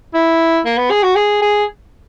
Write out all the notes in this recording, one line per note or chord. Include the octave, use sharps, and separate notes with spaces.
E4
A#3
B3
G#4
F#4
G#4
G#4